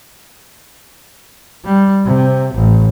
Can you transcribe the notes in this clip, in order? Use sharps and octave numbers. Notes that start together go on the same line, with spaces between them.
G3
C3
A1